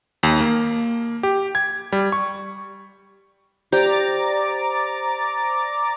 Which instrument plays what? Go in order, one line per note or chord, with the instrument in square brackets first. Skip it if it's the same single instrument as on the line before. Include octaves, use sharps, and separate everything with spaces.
[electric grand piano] D#2
A#3
G4
G#6
G3
C#6
[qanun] G4 [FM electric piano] C5 D5 [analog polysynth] A#5 D6 A6